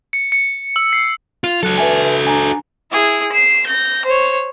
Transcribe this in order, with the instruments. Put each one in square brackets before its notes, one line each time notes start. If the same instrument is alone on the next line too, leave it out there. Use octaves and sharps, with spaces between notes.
[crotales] C#7
C#7
E6
C7
[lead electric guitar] F4
[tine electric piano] F#3 F#6 [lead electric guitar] F#4 A4
[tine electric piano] B4 E5 G#5
D4 G#5 A#5
[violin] E4 G#4
C7 E7
G6 A#6
C5 C#5